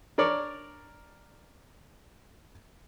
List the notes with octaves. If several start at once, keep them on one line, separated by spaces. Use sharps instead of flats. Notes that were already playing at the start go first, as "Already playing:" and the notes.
D4 A#4 C#5 D5